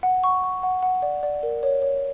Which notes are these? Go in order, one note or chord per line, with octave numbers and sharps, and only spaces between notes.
F#5
C#6
C#6
F#5
F#5
D5
D5
A#4
C#5
C#5